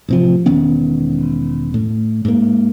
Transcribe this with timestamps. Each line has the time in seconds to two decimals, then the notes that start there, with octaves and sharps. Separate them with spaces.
0.09 A1 C3 F3
0.46 E1 D#3 B3 C#4
1.74 A2
2.25 G#2 A#3